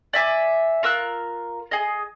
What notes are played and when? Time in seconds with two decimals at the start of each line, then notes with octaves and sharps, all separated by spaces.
0.13 D5 E5 G#5 D6
0.83 F4 A#4 E6 F#6
1.71 G#4 D#5